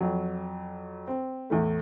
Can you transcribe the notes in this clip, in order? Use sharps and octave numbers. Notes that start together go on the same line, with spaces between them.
F2 F#3
C4
E2 A2 A3